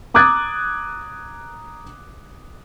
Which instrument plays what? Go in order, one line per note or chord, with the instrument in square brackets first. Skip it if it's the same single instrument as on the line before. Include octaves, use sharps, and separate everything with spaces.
[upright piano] A#5 D6 D#6 F#6 G#6 A6